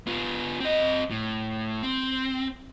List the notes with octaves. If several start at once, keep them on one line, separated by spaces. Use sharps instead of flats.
B3 F4
C4 D#5
A2
C4